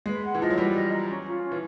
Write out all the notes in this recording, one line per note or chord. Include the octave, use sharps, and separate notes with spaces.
G#3 B4
F#5
E3
F3 D#5
F#3
G3 B4
D#5
A#5
C#4
F4
C#4
E3